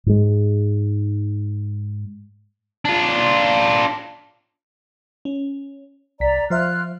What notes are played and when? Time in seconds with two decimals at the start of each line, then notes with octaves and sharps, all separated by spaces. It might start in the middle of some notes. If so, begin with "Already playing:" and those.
0.06 G#2 G#3
2.85 D4 F4
5.25 C#4
6.20 C2 D5 A#5 B6
6.50 F3 F4 C5 E5 F6 F#6